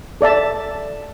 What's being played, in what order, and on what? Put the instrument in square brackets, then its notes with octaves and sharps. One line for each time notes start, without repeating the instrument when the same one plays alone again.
[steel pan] A4 D5 E5 A5